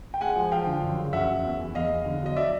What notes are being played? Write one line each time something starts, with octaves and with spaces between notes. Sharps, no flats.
G5
G#3 F#5 G#5
F3
F3 F5 G5
D3
F#2
C#3
F#2 E5 F#5
F#2
E2
E3
E2 D#5 F5
E2
D3
F#3 D#5
F#3 D5 E5